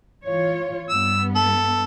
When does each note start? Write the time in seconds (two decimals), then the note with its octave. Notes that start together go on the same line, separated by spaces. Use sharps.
0.24 E3 F4 C#5
0.89 G2 B3 E6
1.36 A4